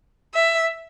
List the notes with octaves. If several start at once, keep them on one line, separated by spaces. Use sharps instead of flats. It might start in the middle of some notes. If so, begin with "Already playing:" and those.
E5